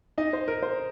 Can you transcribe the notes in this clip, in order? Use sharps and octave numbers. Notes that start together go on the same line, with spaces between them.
D#4 D#5
C5
A#4
C5